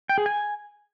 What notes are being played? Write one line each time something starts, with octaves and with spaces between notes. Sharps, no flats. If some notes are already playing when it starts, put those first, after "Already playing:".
G5
G#4
G#5